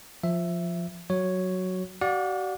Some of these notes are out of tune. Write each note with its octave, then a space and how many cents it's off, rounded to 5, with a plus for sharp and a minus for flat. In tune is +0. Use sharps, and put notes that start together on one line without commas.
F3 +0 E5 +10
F#3 +0 F#4 +0 C#5 +0
F#4 +45 D5 +0 F#5 -45